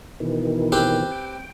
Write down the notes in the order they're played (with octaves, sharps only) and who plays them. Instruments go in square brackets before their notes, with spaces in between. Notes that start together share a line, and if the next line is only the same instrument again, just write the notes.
[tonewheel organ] B2 D#3 E3
[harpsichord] C4 G4 B4
[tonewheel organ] G5